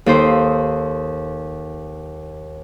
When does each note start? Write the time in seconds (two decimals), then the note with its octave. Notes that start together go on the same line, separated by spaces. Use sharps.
0.06 D#2 A4 C5 D#6